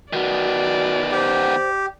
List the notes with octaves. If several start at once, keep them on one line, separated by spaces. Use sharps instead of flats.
D#3 B3 F#4 D5
G4 C5